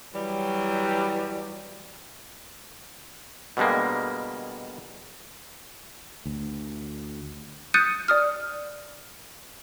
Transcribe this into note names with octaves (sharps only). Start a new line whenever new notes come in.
E3 F#3 G3
B2 D3 G3 G#3 A#3
D2
D#6 F#6 G6 A6 C#7 D#7
D5 D#6 F6